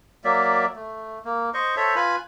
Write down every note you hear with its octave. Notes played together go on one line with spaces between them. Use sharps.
F#3 A#3 D5 E5
A3
A#3
C5 D#5 C#6
A4 C5 C#5 E5
F4 B4 G#5 B5